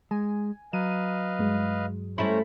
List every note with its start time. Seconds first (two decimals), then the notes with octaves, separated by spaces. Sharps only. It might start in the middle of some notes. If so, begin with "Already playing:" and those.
0.11 G#3 G#5
0.73 F#3 B4 D#5 F5 D#7
1.39 G2 G#3
2.18 G3 A3 C#4 E4 C5 A#5 B5